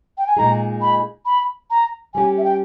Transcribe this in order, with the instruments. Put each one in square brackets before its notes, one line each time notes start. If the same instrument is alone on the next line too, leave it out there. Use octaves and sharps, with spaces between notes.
[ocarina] G5
G#5
[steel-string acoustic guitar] A#2 G#3 D#4 G#4 [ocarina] A#5
[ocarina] B5
B5
A#5
[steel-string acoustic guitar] G3 C#4 G4 [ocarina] G#5
[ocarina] E5
G5